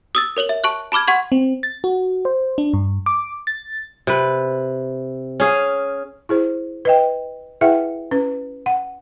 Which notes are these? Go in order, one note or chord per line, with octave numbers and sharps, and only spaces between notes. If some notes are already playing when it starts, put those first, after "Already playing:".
D#6 E6 A6
A#4 C#5 F7 F#7
E5
A5 C#6 F#6
A5 B5 D6 F6 G#6
F#5 C6 C#6 G#6
C4
A6
F#4
C5
D4
G2
D6
A6
C3 B4
C#4 G#4 F5
E4 G#4 C5
B4 D#5 G5
E4 G#4 B4 E5 F#5 G5
C#4 B4
F#5